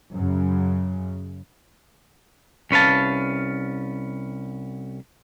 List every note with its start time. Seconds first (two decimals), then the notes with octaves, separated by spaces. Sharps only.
0.13 F#2 C#3
2.71 C2 C#4 B4 F5 A5